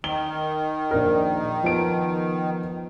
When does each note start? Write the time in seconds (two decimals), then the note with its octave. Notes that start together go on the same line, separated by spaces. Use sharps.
0.04 D#3 G7
0.91 A#1 A#4
1.63 F3 B3 D7